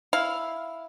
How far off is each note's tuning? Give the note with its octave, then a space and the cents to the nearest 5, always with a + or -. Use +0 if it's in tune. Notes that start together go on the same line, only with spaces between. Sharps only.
E4 +0 F5 +0